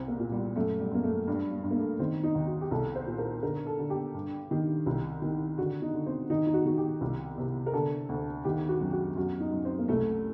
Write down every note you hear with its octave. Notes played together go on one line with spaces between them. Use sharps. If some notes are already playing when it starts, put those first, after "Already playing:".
Already playing: C2 C4
A#3
A#2
G3
F#2 A3
G3
F#2 A#3
A3
G2 G3
G3
G2
A#3
A3
D#3 C4
D#4
D#2
F#4
G4
C2 A4
C5
A#2
A#4
D3 A#4
A4
D3
G4
G2
D#3
C2
D#3
D3 F#4
D#4
D3
C4
D#3 D#4
D#4
F#4
D#3 F#4
G4
C2
C3
A#4
D3 A4
D2
D#3 G4
F#4
F#2
F#4
F#2 F#4
D#4
F#2
C4
A#3
C2 A3